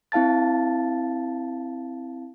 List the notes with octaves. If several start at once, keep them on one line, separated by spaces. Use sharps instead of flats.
C4 E4 F5 A5 A6